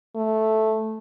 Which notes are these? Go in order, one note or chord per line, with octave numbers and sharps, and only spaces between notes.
A3